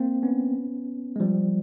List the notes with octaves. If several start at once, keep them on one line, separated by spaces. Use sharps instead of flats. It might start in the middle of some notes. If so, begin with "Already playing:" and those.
Already playing: A#3 C4
B3 C#4
G#3
F3 G3